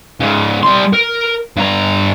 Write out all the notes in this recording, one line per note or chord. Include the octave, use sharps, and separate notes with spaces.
G#2 C#3
G3 C6
A#4
G2 A#5